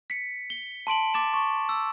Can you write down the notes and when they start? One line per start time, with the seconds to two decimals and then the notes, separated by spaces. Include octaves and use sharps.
0.10 B6 C#7
0.50 G7
0.87 A5 C6 D7 F#7
1.14 D6 A6 E7
1.34 C#6
1.69 E6